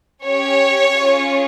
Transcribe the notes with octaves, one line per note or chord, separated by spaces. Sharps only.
C#4 G4 C#5
C#4 F4 G#4